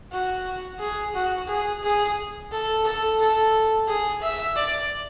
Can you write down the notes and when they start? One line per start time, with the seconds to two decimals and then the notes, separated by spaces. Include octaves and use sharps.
0.12 F#4
0.80 G#4
1.15 F#4
1.48 G#4
1.84 G#4
2.52 A4
2.85 A4
3.20 A4
3.88 G#4
4.23 E5
4.57 D5